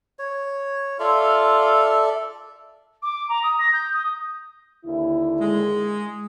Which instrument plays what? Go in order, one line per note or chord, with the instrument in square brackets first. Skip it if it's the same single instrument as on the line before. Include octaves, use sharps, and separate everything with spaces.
[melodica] C#5
[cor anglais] F4 [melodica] A4 D5 E5
[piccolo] D6
A#5
D#6
A#6
G6
D#6
[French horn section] D#2 D3 E4
[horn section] G#3